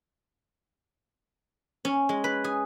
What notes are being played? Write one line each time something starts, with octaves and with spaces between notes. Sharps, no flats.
C#4
G#3
B4
G#4